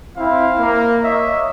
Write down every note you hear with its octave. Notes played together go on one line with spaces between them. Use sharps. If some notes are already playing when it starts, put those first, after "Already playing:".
C4 E4 F5
A#3
A#3 C#5 D#5 E5